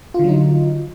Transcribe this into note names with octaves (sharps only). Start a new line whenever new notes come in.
D3 F#3 D#4 F4